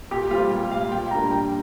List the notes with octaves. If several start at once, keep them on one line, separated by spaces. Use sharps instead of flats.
A#2 G4
G3 C4 F4
A#2 G4
G3 C4 F5
A#2 G5
G3 A#3 D4 A#5
A#2 G5